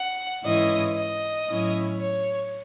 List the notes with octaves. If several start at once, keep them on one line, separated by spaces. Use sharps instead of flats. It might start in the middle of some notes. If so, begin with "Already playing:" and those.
Already playing: F#5
G#2 E3 G#3 C#4 E4 D#5
D#5
A2 F#3 C#4 E4
C#5